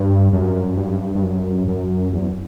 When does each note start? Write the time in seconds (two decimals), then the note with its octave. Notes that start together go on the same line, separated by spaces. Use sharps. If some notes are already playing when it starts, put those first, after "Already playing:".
Already playing: G2
0.33 F#2
0.77 G2
1.15 G2
1.23 F#2
1.68 F#2
2.13 E2